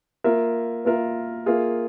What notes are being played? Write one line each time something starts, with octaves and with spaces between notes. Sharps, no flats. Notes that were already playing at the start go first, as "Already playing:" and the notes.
A#3 F4 A#4 E5
A#3 F4 A#4 E5
A#3 F4 G#4 E5